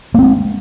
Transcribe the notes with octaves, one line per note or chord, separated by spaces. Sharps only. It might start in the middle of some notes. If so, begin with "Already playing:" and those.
G#3 A#3 C4